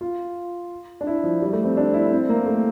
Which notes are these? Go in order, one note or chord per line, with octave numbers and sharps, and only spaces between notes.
F4
D4
E4
F3
G3
A3
C4
D4
E4
C4
A#3
A3